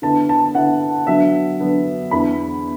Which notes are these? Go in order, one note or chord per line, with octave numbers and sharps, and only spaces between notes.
D3 B3 E4 A5
A5
D3 B3 E4 F#5
D3 F#3 B3 D4 E5
D3 F#3 B3 D4
E2 E3 D4 B5